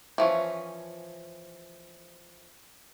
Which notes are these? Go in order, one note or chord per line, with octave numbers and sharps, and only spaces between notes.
E3 F3 C#4